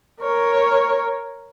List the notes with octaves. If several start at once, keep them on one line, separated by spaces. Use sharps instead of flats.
A#4 C#5